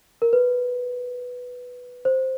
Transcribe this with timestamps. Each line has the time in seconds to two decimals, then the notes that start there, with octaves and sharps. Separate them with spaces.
0.22 A#4
0.33 B4
2.05 C5